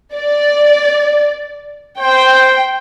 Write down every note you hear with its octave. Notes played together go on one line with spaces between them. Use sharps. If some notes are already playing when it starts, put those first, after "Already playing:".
D5
C5 G5